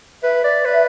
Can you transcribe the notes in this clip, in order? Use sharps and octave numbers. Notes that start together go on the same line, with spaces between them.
B4 E5
D5
B4